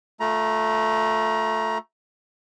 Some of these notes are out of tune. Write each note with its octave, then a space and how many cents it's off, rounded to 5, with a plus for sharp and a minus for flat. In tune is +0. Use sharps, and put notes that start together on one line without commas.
A3 +0 F4 +20 A#5 +20